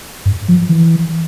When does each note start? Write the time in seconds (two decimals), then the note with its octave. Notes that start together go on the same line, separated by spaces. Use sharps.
0.25 G2
0.48 F3
0.69 E3